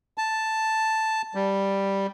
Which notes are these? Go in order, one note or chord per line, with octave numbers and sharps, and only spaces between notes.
A5
G3